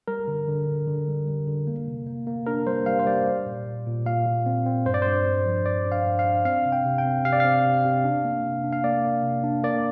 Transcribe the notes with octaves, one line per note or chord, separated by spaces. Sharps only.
G3 A#4
D3
D3
D3
D3
G3
G3
D3
A#3
C3
A#3
A#3
D4 A#4
G3 C5
G3 F5
C5
G3 D5
G3
A#2
A#2
A#2
A#2 F5
A#2
C4
C4
G2 C5
D5
G2 C5
G2
F3
G2 D5
D4
F5
G2
F5
D4
C4 F5
C3
G5
C3
G5
C4
C3 F5
D5
C4 F5
C3
C3
D4
A#3
C3
D4
F5
A#3 D5
A#3
C3
D4
A#3 D5